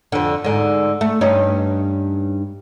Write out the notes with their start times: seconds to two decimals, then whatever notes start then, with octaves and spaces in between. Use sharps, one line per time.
0.12 F2 D3
0.44 G#2 D3
1.01 A3
1.21 G2 C#4 D#4